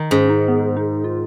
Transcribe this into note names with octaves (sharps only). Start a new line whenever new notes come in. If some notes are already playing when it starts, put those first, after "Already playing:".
Already playing: D#3
G#2 C#4
D#4
B3
D#4
F4